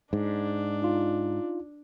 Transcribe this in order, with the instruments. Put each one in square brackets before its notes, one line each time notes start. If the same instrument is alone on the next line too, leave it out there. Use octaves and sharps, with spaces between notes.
[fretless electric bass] G#2 [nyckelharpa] D4
[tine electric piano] D#4 F4